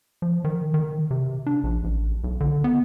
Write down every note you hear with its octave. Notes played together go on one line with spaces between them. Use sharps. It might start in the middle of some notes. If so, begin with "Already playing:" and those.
F3
D#3
D#3
C3
D4
A#1
A1
B1
D3
B3